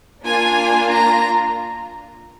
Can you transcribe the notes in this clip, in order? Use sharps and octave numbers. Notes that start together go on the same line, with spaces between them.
A#3 D4 F4 G#5
A#5